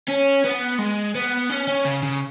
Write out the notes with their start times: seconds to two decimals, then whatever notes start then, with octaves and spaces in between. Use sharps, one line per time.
0.09 C#4
0.44 B3
0.79 G#3
1.15 B3
1.50 C#4
1.68 C#4
1.85 C#3
2.03 C#3